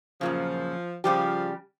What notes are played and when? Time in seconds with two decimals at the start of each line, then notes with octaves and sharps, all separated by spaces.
0.21 F#2 A#2 C#3 F3
1.04 C#3 F3 G3 G4